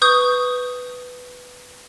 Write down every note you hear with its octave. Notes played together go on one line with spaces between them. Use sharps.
B4 C#6 D#6 G6